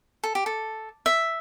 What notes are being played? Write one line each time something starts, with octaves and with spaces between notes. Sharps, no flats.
A4
G4
A4
E5